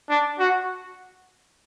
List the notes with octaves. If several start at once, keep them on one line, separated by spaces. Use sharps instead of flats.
D4
F#4